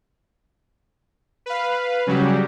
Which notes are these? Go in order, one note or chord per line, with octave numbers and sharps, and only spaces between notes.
B4 F5
C#3 F#3 G3 F#4 G4